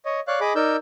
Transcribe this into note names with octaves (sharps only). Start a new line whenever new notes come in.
C#5 D#5
C#5 D5 F5 F#6
G#4 D#5 B5 D6
D#4 A#4 D5 E6 G6